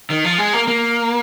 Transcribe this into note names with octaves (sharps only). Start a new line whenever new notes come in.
D#3
F3
G#3
A#3
A#3